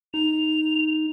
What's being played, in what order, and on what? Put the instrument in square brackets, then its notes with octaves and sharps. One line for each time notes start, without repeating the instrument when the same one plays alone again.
[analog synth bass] D#4 [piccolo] F7